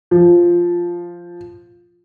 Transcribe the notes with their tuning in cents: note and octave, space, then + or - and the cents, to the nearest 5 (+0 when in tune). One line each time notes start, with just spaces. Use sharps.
F3 +0